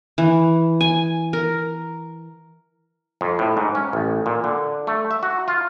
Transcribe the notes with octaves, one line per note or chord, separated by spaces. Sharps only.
E3
G#5
A#4
F2
A2
G#2
C#4
A1
A#2
D3
A3
E5
F#4
F4